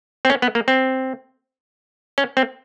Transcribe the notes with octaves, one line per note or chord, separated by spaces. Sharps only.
C4
C#4
B3
A#3
C4
C#4
C4